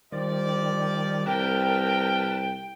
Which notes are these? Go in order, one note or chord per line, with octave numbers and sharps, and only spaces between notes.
D#3 F3 G3 D5
C2 A#4 B4 G5 A5